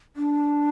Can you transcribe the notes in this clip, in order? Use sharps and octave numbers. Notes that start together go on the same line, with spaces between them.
D4